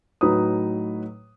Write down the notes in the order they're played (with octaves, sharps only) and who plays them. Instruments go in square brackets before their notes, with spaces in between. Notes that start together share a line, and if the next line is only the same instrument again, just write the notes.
[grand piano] A2 F#3 D#4 B4 D#6